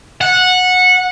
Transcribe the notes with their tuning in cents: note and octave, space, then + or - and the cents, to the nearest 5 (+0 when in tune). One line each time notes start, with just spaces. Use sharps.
F#5 -15